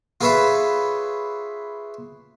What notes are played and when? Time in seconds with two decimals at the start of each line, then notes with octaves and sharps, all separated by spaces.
0.21 F4 G#4 B4 C#5 E5